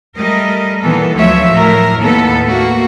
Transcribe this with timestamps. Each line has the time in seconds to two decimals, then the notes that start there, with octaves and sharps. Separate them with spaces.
0.15 G3 A3 A#4 D#5
0.82 A#2 D#3 E3 B3 A4
1.15 D2 F3 F#3 A3 C#5 E5
1.52 A2 A#4
2.01 D#2 A2 B3 A4 B4
2.46 A3 A#3 F#4